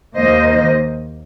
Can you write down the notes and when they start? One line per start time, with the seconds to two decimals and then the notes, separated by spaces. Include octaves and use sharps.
0.15 D#2 D#3 A#3 C5 D#5